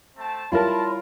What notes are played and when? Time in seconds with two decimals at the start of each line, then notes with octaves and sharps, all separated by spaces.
0.16 A3 C4 A5
0.52 G3 E4 F4 A#4 C#5 A5 B5 C6